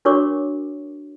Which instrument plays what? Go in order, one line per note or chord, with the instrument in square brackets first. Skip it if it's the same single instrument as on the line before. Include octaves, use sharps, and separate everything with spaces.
[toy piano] D4 F#4 A#4 C#5 C#6 D6